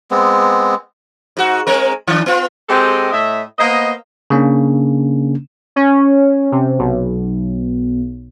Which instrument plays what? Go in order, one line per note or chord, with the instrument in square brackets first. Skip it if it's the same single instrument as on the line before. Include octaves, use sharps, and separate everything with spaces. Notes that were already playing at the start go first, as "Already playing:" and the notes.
[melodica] G#3 B3 C4
[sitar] G#2 F#4
G#3 C4 A#4
D#3 D4
B3 F4
[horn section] G#3 C4 G4 A4 D#5 G5
A2 D#5 E5
A#3 B3 C5 D#5
[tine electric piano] C#3 A#3 C#4 D4
[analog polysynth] C#4
C3
B1